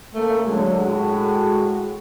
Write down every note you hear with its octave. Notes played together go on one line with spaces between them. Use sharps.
C#3 A3 A#3
D3 F#3 G#3
A2 F#4